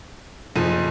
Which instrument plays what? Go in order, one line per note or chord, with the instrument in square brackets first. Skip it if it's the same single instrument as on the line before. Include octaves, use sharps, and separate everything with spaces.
[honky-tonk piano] F#1 F3 D#7 [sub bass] C3